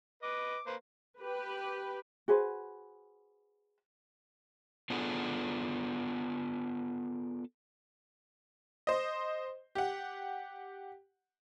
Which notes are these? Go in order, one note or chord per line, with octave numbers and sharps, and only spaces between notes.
B4 D#5 D6
A#3 B4 C5
G4 B4
F#4 G#4 B4 C5
B3 D4 F4 G#4 A4 B4
C5 D#5
G4 F#5